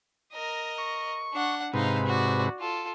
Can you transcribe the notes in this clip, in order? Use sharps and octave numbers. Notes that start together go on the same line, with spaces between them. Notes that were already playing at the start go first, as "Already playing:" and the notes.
A#4 D#5
C#6
D4 F#5
G#2 C3 D#4 B4 F5
F#4 D5
F4 A4